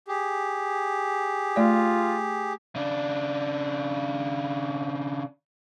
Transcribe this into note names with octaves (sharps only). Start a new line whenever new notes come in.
G4 G#4
A3 F4 D5
C#3 D4